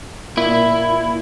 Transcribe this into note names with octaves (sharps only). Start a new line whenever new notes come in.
A#2 E4